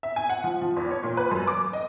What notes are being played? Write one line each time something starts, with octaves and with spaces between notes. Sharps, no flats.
E5
G#5
F#5
F3
F3
E2
C#5
A#2
B4
F#2
D6
D#5